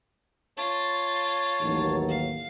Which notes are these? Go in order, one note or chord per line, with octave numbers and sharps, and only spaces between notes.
F4 C#5 A5 A6
A1 D#2 F#3
F5